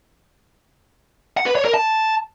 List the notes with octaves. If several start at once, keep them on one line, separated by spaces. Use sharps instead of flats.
F#5
B4
C#5
A#4
A5